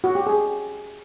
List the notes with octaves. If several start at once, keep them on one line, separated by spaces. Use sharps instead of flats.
F#4
G4
G#4